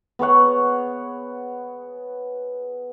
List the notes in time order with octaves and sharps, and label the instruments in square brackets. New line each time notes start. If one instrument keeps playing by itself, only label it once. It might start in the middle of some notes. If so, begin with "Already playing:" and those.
[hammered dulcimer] B3 G#4 C#5 F#5